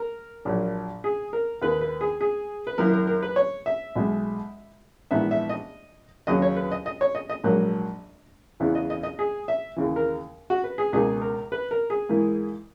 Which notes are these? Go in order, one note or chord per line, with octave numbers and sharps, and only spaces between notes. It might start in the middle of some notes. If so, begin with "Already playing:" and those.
Already playing: A#4
A#1 A#2 F#3
G#4
A#4
D#2 D#3 A#3 B4
B4
G#4
G#4
B4
F#2 D#3 A#3 E4 A#4
A#4
A#4
B4
C#5
E5
B1 B2 G#3
A#1 G#2 E3 B3 D#4 E5
E5
D#5
D#2 C#3 F#3 C#4 D#5
C#5
B4
D#5
D#5
C#5
D#5
D#5
A#1 G#2 F#3 A#3
E2 C#3 E3 B3 E4
D#5
D#5
D#5
G#4
E5
D#2 C#3 E3
A#4
F#4
B4
G#4
C#2 B2 A#3 D#4 G#4
A#4
B4
A#4
G#4
G#2 E3 A#3 E4